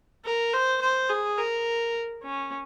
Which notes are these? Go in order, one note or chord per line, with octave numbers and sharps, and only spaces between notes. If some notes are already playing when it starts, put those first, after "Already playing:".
A#4
C5
C5
G#4
A#4
C#4